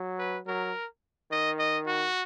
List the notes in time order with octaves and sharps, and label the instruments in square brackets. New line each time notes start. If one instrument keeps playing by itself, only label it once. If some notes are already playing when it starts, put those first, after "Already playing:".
Already playing: [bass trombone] F#3
[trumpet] B4
[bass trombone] F#3 [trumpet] A#4
[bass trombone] D#3 [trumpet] D#5
[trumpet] D#5
F#4